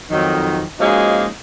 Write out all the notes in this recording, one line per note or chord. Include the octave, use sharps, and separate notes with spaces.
F2 D#3 F#3
F3 G#3 A#3 C#4 D#4 F#4